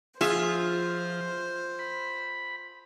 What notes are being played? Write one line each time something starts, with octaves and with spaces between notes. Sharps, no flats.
F3 F4 G#4 C5 E5
B5